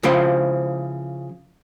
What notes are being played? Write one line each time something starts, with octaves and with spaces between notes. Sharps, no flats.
C#3 F3 E4 C5 G5